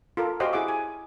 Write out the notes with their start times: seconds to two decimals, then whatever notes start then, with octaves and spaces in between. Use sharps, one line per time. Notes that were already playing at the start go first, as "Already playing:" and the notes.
0.17 F4 A4 A#4
0.40 F#4 G4 C5 D#5 F5 G5
0.52 E4 G#4 F#5 D6 E6
0.68 G#5